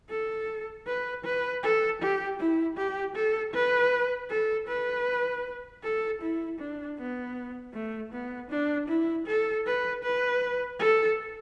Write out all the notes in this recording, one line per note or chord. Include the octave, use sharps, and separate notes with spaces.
A4
B4
B4
A4
G4
E4
G4
A4
B4
A4
B4
A4
E4
D4
B3
A3
B3
D4
E4
A4
B4
B4
A4